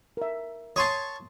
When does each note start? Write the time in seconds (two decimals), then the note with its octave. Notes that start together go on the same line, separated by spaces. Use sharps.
0.17 A#4 E5
0.76 C#5 A5 C6 D#6